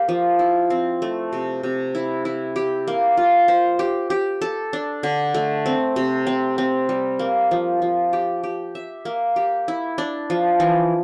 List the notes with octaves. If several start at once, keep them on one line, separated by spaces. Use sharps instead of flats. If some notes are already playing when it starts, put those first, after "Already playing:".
Already playing: A#3 G4
F3
E4
C4
A3
C3
C3
E4
E4
G4
A#3
F4
C5
G4
G4
A4
D4
D3
A3
C4
C3
C4
C4
G3
A#3
F3
F3
G4
G4
E5
A#3
G4
E4
D4
F3
E3